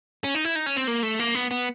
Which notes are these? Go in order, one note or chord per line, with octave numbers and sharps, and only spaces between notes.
C#4
D#4
E4
D#4
C#4
C4
A#3
A3
A#3
B3
B3